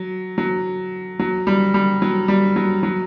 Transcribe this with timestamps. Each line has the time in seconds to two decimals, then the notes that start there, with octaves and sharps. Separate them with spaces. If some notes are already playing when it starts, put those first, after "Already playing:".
Already playing: F#3
0.38 F#3
1.19 F#3
1.47 G3
1.74 G3
2.02 F#3
2.28 G3
2.56 F#3
2.83 F#3